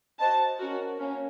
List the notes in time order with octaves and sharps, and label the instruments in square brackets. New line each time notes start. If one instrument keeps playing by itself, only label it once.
[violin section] F#4 C5 D#5 A5
C#4 F#4 A#4
A#3 C#4